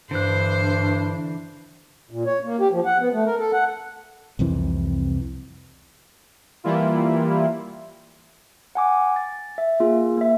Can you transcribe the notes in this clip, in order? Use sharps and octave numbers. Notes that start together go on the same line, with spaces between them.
G2 D3 E3 D4 C5 F#6
A#2
C#5
A#3
G4
F3
F#5
B3
A3
A#4
A4
F#5
C2 F2 C3 E3
E3 G3 A#3 E4 F4
F#5 G#5 D6
A6
E5
A#3 F4 G#4
A#3 E5